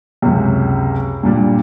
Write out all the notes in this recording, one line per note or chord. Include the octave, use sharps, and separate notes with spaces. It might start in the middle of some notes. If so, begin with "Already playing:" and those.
C#2 F#2 C3
G2 A#2 G3